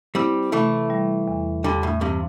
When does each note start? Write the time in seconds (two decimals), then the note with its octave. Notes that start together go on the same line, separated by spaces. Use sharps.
0.15 G3 C4 E4
0.52 C3 E3 A3
0.90 G3
1.28 E2
1.64 E2 D3 G3
1.83 A2
2.01 G2 C3 E3